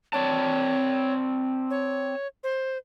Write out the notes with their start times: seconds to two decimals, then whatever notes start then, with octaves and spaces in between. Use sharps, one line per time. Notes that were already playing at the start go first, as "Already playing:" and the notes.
0.13 C4 C#5 D5 A5
1.70 C#5
2.43 C5